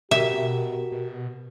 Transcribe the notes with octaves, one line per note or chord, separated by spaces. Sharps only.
B2 F#4 G4 A#4 E5
B2